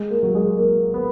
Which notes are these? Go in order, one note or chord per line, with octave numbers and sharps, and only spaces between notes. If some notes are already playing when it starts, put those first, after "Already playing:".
Already playing: G#3
A#3
F#3
G#3
A#3
B3